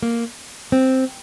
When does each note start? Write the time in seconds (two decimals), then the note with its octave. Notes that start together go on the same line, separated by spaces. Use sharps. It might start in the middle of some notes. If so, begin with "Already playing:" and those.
0.03 A#3
0.72 C4